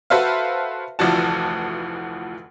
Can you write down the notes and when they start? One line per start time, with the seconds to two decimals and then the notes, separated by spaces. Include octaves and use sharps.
0.10 F#4 A4 B4 C5 E5 F5
0.99 F1 D2 E3 F3 F#4 A5